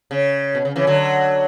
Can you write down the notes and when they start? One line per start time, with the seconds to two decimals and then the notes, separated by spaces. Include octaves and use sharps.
0.11 C#3
0.55 B2
0.65 C#3
0.76 C#3 E3
0.87 D3 F#3